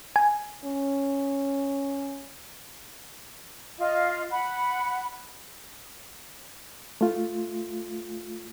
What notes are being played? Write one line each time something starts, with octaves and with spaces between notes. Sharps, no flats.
G#5
C#4
F4 D#5 F5
F#5 B5
A3 F4